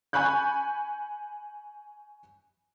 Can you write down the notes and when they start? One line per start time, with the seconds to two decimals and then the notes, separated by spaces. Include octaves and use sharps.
0.13 G#5 B5 C#6 F#6 G6